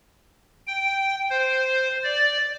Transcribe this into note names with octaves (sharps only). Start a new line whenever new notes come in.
G5
C5
D5